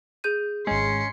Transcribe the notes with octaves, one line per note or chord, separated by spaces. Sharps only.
G#4 G6 D#7
G#1 G#3 C#4 C6 C#7